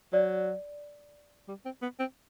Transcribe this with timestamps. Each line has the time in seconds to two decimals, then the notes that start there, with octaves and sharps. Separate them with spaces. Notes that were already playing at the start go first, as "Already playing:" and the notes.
0.13 F#3 D5
1.48 G3
1.65 C4
1.82 B3
1.99 C4